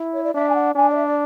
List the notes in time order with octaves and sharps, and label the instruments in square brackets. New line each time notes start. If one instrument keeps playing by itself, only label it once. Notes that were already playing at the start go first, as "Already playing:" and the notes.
Already playing: [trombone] E4
[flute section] C#5
D5
[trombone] D4 [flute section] E5
[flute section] G#5
F#5
[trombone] D4 [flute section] G#5
[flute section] D5
E5
D5